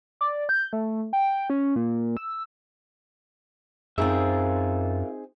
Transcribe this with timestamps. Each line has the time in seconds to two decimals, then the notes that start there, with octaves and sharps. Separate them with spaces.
0.21 D5
0.49 G6
0.73 A3
1.13 G5
1.50 C#4
1.76 A#2
2.17 E6
3.98 F#2 C4 D#4 F4 G#4 A#4 E5